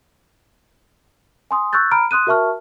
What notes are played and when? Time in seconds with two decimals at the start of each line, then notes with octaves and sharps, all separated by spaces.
1.51 G#5 C6 D#6
1.73 C#6 E6 F#6 G6 A6
1.91 A#5 B5 F6 D7
2.11 C6 D#6 F#6 D#7
2.27 F#4 A#4 E5 A5 C#6 F6